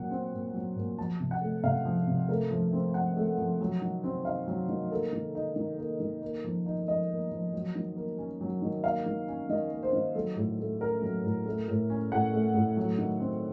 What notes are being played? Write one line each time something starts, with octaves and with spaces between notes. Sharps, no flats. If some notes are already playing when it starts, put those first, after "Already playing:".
Already playing: A#2 F#3 F#5
C4
A#2
F#3
A#2
F3 A5
C3
F#5
A3
C3 F5
F3
C3
A3 A#4
F3
C4
F3 F#5
A3
F3
F#3
D#3
C4
D#4 F5
F#3
D#3
A#3 A4
D#3
D#4
D#3
A#3
D#3
A#3
F3
D#4
F3 D#5
A#3
F3
F#3
D#3
A#3
C#4
F#3
D#3
A#3 F5
D#3
C#4
D#3 D#5
A#3
C5
D#3
F#3 A4
A2
A3
C#4 A#4
F#3
A2
A3
A2
C#4
A2 F#5
A3
A2
F#3
D#3
C4